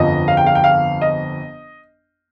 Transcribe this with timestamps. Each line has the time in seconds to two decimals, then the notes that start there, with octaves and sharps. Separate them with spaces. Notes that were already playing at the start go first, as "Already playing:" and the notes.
Already playing: G1 F2 F3 D#5
0.28 F5
0.37 G5
0.46 F5
0.55 G5
0.64 F5
1.01 D#5